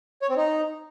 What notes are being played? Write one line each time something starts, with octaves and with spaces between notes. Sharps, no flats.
C#5
C4
D#4